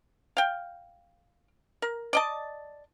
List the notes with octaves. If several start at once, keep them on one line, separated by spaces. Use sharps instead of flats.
F5 G5
A#4
D5 D#5 A5